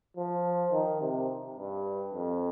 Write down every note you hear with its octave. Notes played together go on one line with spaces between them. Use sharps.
F3
D#3
C3
G2
F2